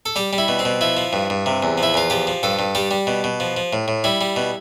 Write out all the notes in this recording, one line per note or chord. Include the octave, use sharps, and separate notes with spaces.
A4
G3 G4
G3
E4
B2
C4
B2
F3 E4
F3
G2
G2
C3
E2
F3
E4
E2 F4
F3 G4
F3
G2 A4
G2
G3 G4
G3
B2
B2
F3
F3
A2
A2
G3 E4
G3
B2